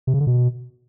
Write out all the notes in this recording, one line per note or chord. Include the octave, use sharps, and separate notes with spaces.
C3
C#3
D3
B2